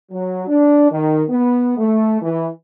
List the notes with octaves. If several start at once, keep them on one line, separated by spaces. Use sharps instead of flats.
F#3
D4
D#3
B3
A3
E3